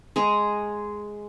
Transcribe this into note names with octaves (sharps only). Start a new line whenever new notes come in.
G#3 G#4 A#5